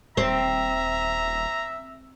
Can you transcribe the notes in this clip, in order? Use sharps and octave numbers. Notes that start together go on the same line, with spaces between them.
D#1 C4 E5 A#5